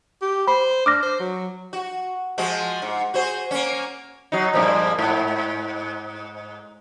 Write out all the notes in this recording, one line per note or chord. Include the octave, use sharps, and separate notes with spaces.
G4
C5 B5
D4 D6 F6 A#6
C5
F#3
F#4
F3 G#3 F#4
G#2
F#4 G#4 C5
A#3 C#4
F#3 D#4
G2 A#2 F3
G#2